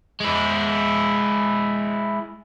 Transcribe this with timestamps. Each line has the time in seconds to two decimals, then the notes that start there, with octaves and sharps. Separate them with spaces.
0.20 G#3 E4